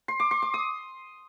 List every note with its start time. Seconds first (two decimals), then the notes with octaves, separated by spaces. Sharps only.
0.08 C6
0.20 D6
0.31 C6
0.42 D6
0.54 D#6